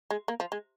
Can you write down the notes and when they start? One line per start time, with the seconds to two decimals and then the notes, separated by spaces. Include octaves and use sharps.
0.10 G#3
0.28 A#3
0.40 F3
0.52 G#3